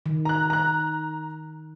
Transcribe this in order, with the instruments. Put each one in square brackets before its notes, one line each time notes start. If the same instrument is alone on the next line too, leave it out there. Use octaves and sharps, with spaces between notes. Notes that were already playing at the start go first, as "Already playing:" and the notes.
[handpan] D#3
[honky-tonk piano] A#5 F#6
A#5 F#6